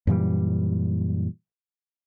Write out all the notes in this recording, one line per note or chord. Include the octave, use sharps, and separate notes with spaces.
F#2 A#2 E3 G3